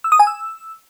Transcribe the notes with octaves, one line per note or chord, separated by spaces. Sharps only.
E6
D#6
G#5
E6